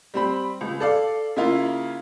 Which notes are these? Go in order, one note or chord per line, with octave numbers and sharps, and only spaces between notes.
G3 C4 B5
C#2
A4 D5 F5
C#3 A#3 E4 F4